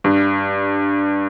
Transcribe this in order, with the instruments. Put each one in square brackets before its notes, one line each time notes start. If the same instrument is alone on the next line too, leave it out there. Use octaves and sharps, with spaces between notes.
[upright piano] G2